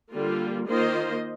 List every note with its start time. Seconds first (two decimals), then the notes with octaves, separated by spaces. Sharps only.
0.12 D3 G3 A#3 F4
0.68 D#3 A#3 F4 C5 D#5